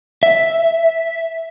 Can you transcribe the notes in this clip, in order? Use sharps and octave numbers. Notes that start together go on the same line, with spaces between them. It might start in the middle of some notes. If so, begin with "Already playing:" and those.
E5